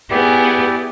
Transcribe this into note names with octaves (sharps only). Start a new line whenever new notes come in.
B3 E4 G4 G#4 D5